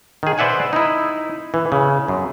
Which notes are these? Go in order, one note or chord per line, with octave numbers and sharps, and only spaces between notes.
D#3 G#4
B4 C5 D5 E5 F#5 G#5
D#4 E4
E3
C#3
F#2